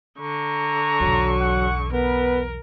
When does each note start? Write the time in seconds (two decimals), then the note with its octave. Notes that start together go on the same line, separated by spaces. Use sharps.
0.19 D3 A#5 C#6
1.00 B1 E2 F#3
1.41 F#5
1.92 B3 A#4 B4